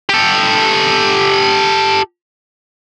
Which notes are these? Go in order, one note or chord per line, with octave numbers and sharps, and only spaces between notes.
G4 A4